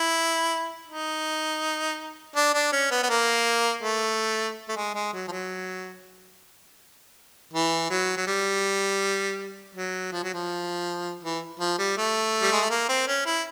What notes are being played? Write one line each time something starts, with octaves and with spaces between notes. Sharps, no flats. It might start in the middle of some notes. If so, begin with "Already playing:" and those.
Already playing: E4
D#4
D4
D4
C#4
B3
B3
A#3
A3
A3
G#3
G#3
F#3
F3
F#3
E3
F#3
F#3
G3
F#3
F3
F#3
F3
E3
F3
G3
A3
G3
G#3
A3
A#3
C4
C#4
E4